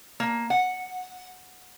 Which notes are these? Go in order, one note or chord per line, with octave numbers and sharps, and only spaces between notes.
A#3
F#5